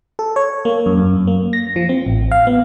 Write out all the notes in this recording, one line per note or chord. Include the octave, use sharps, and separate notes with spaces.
A4
C#5
A#3
F#2
F#2
A#3
A#6
F3
C4
A1
F5
B3